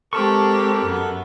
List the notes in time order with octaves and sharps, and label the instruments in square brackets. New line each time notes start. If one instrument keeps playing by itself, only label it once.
[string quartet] G#3 C4 G4 [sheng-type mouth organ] A4 A#4 F#6 [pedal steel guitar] A5 C#6
[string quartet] F#2 B3